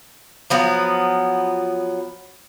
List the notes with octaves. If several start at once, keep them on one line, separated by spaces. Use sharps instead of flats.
F3 F#3 B3